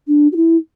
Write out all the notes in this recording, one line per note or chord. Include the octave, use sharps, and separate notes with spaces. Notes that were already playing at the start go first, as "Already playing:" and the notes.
D4
F#4
E4